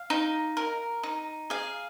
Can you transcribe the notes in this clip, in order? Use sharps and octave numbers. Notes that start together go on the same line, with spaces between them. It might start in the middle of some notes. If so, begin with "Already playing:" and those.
Already playing: F5
D#4
A#4
D#4
G#4 F5